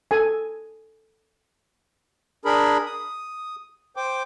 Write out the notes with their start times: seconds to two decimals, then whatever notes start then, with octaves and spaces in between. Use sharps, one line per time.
0.11 A4 G#5
2.45 D4 G#4 A#4 B5
2.86 D#6
3.97 C5 G5 D6